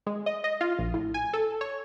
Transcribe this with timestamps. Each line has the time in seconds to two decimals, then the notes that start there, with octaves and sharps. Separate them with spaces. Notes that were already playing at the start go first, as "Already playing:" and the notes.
0.07 G#3
0.26 D#5
0.44 D#5
0.61 F4
0.79 A#1
0.94 A2
1.14 G#5
1.33 A4
1.61 C#5